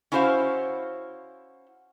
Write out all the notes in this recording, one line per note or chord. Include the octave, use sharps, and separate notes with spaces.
C#4 E4 F#4 C5 D#5 F5